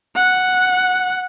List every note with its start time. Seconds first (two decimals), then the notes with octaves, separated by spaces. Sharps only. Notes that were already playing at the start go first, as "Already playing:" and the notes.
0.16 F#5